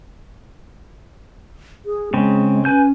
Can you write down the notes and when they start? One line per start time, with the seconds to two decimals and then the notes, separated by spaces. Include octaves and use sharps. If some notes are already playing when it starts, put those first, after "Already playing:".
1.86 G#4
2.14 C#3 G#3 C4
2.65 C#4 B4 G#5 G6